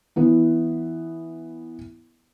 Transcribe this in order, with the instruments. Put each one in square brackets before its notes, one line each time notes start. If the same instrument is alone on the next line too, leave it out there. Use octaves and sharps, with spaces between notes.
[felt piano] E3 B3 E4